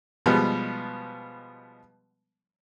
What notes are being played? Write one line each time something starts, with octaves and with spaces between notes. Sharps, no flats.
B2 F3 G3 G#3 B3